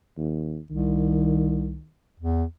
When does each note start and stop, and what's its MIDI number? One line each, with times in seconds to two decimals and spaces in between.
0.17 0.58 39
0.71 1.77 36
0.71 1.89 51
2.20 2.44 40